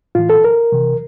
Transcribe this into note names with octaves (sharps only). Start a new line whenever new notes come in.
A2 E3 F4
A4
A#4
C3 E3